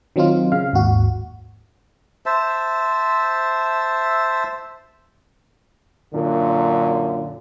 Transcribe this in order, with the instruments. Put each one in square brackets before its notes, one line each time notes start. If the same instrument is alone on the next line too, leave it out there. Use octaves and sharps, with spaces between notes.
[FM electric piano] D#3 F#3 C4 D#4 F4
C#3 F5
G#1 D#2 F#4
[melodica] C5 E5 A5
[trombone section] F#2 A#2 D3